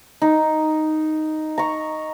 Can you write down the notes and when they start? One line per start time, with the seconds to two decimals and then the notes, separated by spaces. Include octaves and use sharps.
0.22 D#4
1.58 A#5 C#6